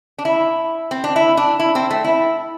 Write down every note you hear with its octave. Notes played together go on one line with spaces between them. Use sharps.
D4
E4
C4
D4
E4
D4
E4
C4
A3
E4